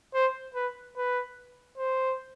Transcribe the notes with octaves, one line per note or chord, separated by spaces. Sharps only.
C5
B4
B4
C5